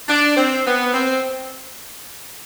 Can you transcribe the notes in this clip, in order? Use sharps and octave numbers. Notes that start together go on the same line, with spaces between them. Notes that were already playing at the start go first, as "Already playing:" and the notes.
D4
C4
B3
C4